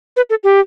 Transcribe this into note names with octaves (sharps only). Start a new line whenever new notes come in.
B4
A4
G4